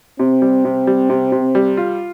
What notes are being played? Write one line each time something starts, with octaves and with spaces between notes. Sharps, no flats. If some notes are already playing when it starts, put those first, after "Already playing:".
C3 C4
G3
C3
G3
C3
C3
G3
F4